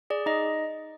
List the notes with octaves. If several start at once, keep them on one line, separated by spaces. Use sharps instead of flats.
G#4 D5
D#4 D#5